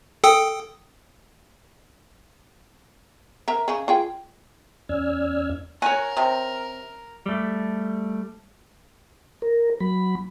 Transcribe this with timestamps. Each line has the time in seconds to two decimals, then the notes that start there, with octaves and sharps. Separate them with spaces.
0.24 A4 G5 D#6
3.48 A#4 E5 A#5
3.68 C#3 G#4
3.88 F4 G#4 G5
4.89 E2 C#4 D5 E6 F6 G#6
5.82 F#4 A#4 C#5 G#5
6.17 C3
7.26 G3 A3
9.42 A#4
9.80 F#3 B5